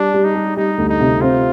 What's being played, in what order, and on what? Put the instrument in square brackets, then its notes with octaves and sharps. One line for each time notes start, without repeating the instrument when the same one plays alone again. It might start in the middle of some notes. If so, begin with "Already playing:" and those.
Already playing: [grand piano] G3 [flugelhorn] D4
[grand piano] G3
[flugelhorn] D#4
[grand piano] G3
[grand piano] G3 [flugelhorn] D#4
[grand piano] D2
[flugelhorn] D#4
[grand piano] C3
[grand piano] C4 [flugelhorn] F4